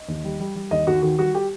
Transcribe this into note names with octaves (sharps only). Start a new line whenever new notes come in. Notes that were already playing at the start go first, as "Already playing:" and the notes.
Already playing: D#5
D#2
G3
G3
G3
D#2 D#5
D#2 F#4
D#3 F#4
G3 F#4
G4